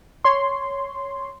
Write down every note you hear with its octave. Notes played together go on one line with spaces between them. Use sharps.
C#5 C6